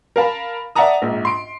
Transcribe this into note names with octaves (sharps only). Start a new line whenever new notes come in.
A#4 F5 A5 B5
D5 E5 F#5 A5 A#5 D#6
A#1 G#2
C6 D7